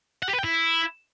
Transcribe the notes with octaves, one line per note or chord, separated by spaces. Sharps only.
F#5
G4
B4
G5
E4